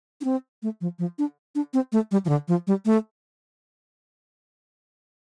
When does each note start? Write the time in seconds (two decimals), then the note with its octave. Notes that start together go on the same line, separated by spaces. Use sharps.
0.21 D4
0.25 C4
0.63 A3
0.81 F3
0.99 F3
1.19 D4
1.55 D4
1.74 C4
1.92 A3
2.11 G3
2.25 F3
2.29 D3
2.48 F3
2.67 G3
2.86 A3